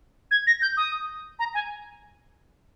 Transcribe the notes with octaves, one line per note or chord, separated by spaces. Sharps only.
G#6
A#6
G6
D#6
A#5
G#5